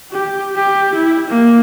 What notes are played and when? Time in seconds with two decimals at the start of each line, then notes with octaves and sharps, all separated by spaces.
0.11 G4
0.55 G4
0.95 E4
1.28 A#3